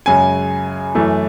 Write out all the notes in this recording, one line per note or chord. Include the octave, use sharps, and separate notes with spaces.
F#2 C#3 G#3 G#5
F#2 E3 A3